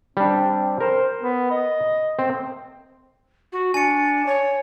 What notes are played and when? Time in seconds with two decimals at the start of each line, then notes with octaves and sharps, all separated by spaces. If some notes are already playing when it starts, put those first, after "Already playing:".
0.17 G3 C4 D4
0.80 A#4 C5
1.21 B3
1.50 D#5
2.19 C4
3.52 F#4
3.74 D4 G#5 C#7
4.27 C#5